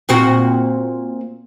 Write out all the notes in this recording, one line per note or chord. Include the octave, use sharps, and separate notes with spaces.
A#2 C4 F#4